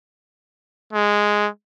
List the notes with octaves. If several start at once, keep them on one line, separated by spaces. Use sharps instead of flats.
G#3